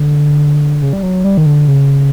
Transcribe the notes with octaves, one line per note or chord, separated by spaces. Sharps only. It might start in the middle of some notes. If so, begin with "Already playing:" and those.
Already playing: D3
C#3
G3
F#3
G3
D#3
D3
C#3